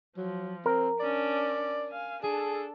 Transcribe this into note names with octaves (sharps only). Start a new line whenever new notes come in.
F3 F#3
C4 A#4
C#4 D4 D5
F5 G#5
D4 G#4 A4